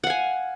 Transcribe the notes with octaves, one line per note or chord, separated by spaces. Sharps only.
F5 F#5 G#5